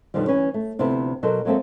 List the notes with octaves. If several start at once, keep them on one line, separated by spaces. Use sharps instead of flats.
F#2 B2 D3 D#3 F3 G3
D2 E3 C#4 B4 C#5
A3
D2 C3 F3 A3 B3 E4
B2 F#3 A4 A#4 C5
F#3 G#3 A#3 C4 A4 E5